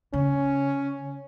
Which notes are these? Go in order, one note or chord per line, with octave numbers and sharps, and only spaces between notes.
C#3 C#4